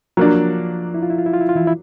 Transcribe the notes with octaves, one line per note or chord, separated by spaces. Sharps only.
F3 F#3 A#3 D4 F4
E4
F4
E4
F4
E4
F4
E4
F4
E3 E4
E4